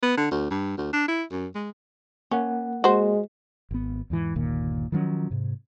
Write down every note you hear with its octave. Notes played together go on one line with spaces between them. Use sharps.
B3
D3
D2
G2
D2
D4
E4
F#2
G#3
A#3 C#4 F#5
G#3 F#4 C5
G#1 B3
E2 G#2 E3
G1 D#2 A#2 D#3
D#3 F3 F#3 C#4
G#2 C3